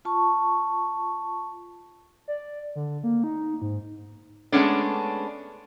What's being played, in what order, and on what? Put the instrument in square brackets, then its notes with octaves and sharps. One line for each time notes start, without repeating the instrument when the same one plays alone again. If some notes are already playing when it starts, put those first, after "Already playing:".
[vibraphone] F4 A5 C#6
[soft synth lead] D5
D3
A#3
D#4
G#2
[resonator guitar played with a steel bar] G#3 A3 B3 C#4 D4